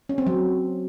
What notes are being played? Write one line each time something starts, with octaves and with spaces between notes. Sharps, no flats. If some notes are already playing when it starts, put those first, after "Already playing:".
C#4
C4
F#3